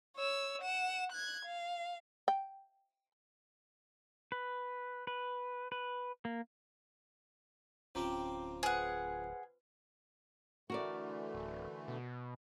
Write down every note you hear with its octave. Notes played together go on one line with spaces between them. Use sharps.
C#5 E6
F#5 E7
F#6 G#6
F5
G5
B4
B4
B4
A#3
D1 F3 C4 C#4 G4 A#5 D6
G#4 B4 C5 F#5
D3 E3 A3 F#4 A#4 D5
D1
B2